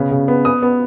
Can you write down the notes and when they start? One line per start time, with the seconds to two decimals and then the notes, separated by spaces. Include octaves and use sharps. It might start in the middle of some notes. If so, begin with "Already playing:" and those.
Already playing: C#3 B3
0.11 C#3
0.28 B3
0.45 B3 D#6
0.62 B3